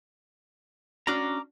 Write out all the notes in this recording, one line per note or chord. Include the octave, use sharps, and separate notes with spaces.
C#4 D4 F#4 A#5 D6